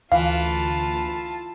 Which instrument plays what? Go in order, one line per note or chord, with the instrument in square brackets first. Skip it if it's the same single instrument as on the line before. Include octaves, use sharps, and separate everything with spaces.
[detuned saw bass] D2 [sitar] E3 [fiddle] F4 A5 [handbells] F5